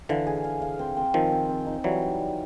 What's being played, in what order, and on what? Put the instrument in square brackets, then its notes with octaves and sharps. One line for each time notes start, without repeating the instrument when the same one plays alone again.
[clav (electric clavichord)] D3 E3 [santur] F5
[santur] G#4
F5
F5
C4
C4
[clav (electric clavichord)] D#3 F3 [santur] C4
[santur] C4
C4
D#4
[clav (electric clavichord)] E3 F#3 [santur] G3